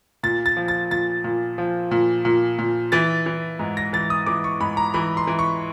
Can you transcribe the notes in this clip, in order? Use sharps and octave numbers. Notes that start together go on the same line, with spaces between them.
A#2 A6
A6
F3
A6
A#2 A6
A#2
F3
A#2
A#2
A#2
E3 A6
E3
G#2
A#6
E3 A6
D#6
E3 D6
C#6
G#2 B5
A#5
E3 B5
C6
E3
C#6